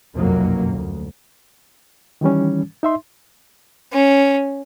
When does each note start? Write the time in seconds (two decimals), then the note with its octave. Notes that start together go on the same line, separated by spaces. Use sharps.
0.14 F1 B1 F#2 F#3 A#3
0.71 D2
2.21 D#3 E3 G3 C#4
2.83 D#4 E5 C6
3.93 C#4